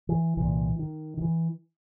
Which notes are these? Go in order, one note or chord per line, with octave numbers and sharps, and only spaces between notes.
E3
C2 A#2 E3
D#3
D#3
E3